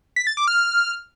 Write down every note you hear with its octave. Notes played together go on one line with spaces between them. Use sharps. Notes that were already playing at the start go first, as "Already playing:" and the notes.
B6
A6
D6
F6